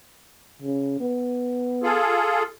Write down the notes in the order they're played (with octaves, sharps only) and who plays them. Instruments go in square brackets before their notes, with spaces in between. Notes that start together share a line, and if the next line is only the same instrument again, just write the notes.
[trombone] C#3
B3
[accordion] F4 G#4 A4